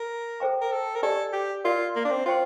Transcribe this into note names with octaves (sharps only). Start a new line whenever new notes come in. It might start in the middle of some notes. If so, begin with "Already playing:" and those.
Already playing: A#4
A4 C5 G5 A#5
A#4
A4
A#4
D4 G4 A4 D5
G4
F4 A#4 D5 F5
A#3
D4
C4
F4 C5 G5 C6